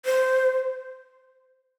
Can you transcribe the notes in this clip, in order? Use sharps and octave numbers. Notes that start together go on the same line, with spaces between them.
C5